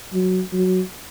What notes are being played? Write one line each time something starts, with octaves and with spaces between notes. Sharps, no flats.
F#3
F#3